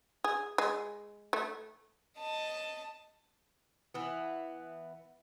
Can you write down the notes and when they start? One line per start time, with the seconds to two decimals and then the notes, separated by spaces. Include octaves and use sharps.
0.24 G#4
0.58 G#3
1.33 A3
2.18 D#5 A5
3.94 E3 B3